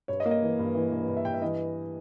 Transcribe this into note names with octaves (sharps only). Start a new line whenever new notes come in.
G2 C#5
D#5
A#3
D#5
E3
G2
E3
G2
G2
E5
G2 G5
E5
E3 D#5